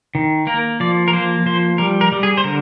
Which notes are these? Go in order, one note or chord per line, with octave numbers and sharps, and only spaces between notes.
D#3
A#3 A#4
F3 D5
A#4
A#3 C5
F3 C5
G3 A#4
A#4
G3
G#4
C5
D3 A#4